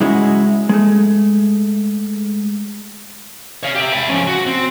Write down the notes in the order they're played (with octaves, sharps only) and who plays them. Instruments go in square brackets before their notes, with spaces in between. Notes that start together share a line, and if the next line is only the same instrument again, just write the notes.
[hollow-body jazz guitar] G#2 C#3 G#3 D#4 E4 F#4
G#3 A3
[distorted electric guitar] C#5 F5
G4 E5
B4 G5
F3 C#4
F#4
C4